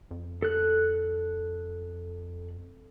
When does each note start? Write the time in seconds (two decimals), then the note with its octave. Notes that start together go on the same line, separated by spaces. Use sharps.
0.11 F2
0.42 A4 F#6